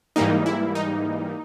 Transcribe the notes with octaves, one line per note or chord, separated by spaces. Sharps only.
G#2 E3 G3 A#3 D#4
E4
D#4